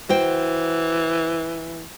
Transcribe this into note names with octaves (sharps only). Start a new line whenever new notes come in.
E3 F#4 C5 G5